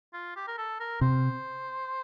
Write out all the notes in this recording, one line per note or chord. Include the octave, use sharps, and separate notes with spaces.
F4
G4
A#4
A4
A#4
C3 C5